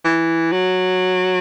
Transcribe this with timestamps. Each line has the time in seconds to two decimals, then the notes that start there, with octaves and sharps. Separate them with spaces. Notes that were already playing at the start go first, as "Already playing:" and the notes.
0.05 E3
0.52 F#3